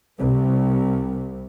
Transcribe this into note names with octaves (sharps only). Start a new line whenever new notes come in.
C2